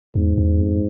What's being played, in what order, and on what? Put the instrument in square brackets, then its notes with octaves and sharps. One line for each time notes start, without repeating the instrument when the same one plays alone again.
[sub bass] E2 [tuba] G#2
[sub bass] E2
F2